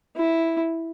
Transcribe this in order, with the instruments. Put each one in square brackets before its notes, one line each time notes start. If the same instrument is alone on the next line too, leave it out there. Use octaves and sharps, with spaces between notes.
[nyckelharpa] E4